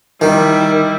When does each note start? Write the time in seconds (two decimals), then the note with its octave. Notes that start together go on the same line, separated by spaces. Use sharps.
0.21 D#3 G3 E4